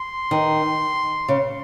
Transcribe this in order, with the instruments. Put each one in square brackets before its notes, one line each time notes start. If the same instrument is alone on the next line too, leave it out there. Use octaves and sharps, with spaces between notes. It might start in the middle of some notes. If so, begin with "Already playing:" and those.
Already playing: [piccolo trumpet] C6
[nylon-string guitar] D#3
C#3